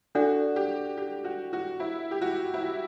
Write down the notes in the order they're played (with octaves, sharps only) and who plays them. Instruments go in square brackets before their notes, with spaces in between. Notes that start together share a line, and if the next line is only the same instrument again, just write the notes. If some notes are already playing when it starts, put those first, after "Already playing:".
[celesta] D4 A4 D5 F#5 [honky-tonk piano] F#4
[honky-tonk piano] G4
G4
F#4
F#4
E4
G4
F#4
E4
F#4